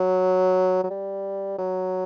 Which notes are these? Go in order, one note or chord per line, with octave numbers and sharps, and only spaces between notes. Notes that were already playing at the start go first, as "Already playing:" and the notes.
Already playing: F#3
F#3
G3
F#3